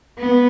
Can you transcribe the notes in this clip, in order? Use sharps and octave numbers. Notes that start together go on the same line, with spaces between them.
B3